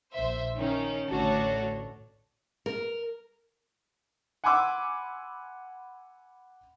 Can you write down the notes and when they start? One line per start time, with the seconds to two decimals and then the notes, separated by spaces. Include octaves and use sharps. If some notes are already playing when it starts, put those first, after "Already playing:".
0.12 A#1 C5 E5
0.56 D#3 C#4 D#4
1.08 A1 D2 D4 F#4 A4 C#5
2.66 A#4
4.44 F#5 G#5 B5 C6 D6 E6